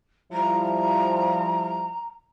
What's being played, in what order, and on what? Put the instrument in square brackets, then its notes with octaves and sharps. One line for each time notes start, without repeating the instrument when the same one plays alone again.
[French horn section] F3 G3 E4 [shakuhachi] A#5